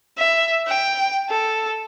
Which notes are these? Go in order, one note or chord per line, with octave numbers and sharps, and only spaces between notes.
E5
G5
A4